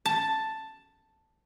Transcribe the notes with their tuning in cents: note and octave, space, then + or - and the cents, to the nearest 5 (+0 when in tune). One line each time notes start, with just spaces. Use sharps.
A5 +5